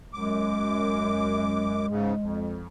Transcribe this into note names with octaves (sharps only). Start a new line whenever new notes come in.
F#2 G#3 D6
G#2 C#3
F2